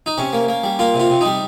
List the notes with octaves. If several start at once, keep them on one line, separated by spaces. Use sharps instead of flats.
D#4
C3 C#4
A#3
A#3
G3
A#3 F4
C3
F4
C3
G3 D#4